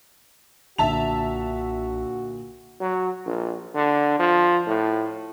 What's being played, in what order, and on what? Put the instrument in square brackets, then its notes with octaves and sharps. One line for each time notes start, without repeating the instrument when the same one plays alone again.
[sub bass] B1 [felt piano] A#2 D3 [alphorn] F#4 [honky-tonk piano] E5 A5 F7
[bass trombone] F#3
A#1
D3
F3
A2